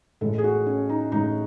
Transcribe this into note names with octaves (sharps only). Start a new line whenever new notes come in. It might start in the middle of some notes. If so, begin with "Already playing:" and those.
A1 A2 G#3 A4
G#4
F#4
C#4
D#4
A1 A2 G#3 D#4